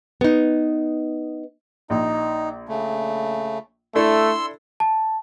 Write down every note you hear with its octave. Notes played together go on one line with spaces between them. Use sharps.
B3 D#4
A#1 D#4
C#3 A3
A3 D4 E4 A4 C6 E6
A5